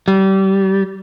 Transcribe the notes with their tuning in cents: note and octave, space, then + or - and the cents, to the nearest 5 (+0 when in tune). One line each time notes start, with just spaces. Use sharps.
G3 -25